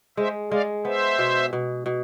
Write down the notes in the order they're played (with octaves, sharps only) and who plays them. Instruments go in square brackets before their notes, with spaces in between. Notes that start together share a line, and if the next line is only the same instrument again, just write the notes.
[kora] G#3 [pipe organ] C5 E5
[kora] G#3 [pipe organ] D5 F5
[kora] B3 [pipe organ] C5 E5
[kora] B2
B2
B2